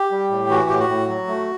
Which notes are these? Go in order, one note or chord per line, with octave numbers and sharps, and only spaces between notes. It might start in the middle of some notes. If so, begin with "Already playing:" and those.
Already playing: G4
G3
A2
E3 F#4
A2 G4
F#4
A2
F#3
A3